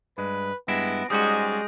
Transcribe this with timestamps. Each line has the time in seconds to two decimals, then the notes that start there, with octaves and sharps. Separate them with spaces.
0.18 G2 G#3 B4
0.68 G2 G#3 B3 E4 A#6 D7
1.10 G#2 G3 G#3 C#4 F#4 D#6 G6